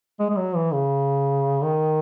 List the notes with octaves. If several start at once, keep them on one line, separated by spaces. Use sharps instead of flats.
G#3
G#3
F#3
E3
C#3
D#3